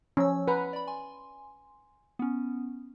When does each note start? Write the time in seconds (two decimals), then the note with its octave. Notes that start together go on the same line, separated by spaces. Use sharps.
0.17 F3 C#4 E6
0.48 B4 F#5 G#5 A#5
0.73 D5 B5
0.87 G#5 C6
2.19 B3 C#4